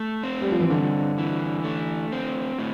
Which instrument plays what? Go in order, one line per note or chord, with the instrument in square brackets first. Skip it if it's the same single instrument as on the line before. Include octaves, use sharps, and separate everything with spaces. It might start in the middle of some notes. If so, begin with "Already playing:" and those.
Already playing: [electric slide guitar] A3
C4
[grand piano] G3
F3
E3
[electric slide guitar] G2 [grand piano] D3
[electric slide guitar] E3
A3
C4
A2